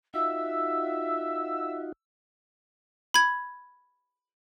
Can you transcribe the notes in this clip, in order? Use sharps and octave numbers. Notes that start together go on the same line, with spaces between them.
D#4 F4 F#4 E5 E6
B5 G#6